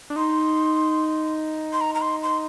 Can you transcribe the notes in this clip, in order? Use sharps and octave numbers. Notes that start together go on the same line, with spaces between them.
D4
D#4 C6
C6
A#5
A#5
C6
C6